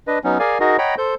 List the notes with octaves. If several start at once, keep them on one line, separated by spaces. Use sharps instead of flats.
D4 B4 D#5
F#3 B3 C#4 D#4
G#4 A#4 D5 F5 G#5
D#4 F#4 G#4 A#4 D#5
C#5 D#5 F#5 G5 A#5 B5
A4 C5 G6